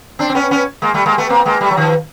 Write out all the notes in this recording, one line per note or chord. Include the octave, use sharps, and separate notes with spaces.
C4 D4
C4
B3 C#4
B3 C#4
G#3 A#3
G3 A3
G#3 A#3
A3 B3
A#3 C4
G#3 A#3
G3 A3
F#3
D#3 F3